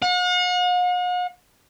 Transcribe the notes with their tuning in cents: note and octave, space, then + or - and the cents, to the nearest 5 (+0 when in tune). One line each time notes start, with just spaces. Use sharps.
F#5 -45